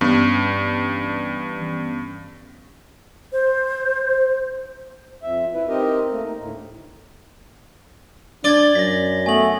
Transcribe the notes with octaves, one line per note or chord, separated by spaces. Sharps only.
G2 E3 B3 C#4
C5
F2 E5
E4 B4
C4 D#4 G4 A#4 D#5
A3 A#3
D#4
D2 A2
D4 D5 G#6 A6 G7
F#2 A#6 B6
A3 B3 G#5 F#7